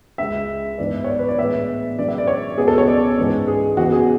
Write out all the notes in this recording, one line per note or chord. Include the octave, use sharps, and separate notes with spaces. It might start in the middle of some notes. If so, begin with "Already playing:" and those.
C#2 C#3 G#3 E5
G#2 E3 B3 D4 D5
C#5
D5
B4
D5
A2 E3 G#3 B3 E5
F#2 E3 G#3 D4 D5
E5
D5
C#5
C#2 B2 G#3 B3 G#4
A4
C#5
D5
G#2 E3 G#3 C#4
G#4
E2 C#3 E3 F#4
G#4